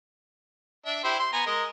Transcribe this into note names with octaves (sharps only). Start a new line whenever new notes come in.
D4 E5
E4 G4 C5
C6
B3 G#5 A#5
G#3 A#4 D#5